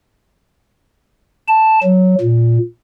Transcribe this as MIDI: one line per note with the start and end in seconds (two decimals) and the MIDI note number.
1.48 1.79 81
1.83 2.15 54
2.21 2.58 46